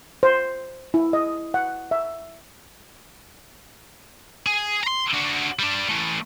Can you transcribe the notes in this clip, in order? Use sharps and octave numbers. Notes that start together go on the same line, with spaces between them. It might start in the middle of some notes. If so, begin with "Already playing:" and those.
C5
E4
D#5
F#5
E5
G#4
A#5 C6
D4 F#4
G3 D4
E3 A3